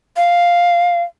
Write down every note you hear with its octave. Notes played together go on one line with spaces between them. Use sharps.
F5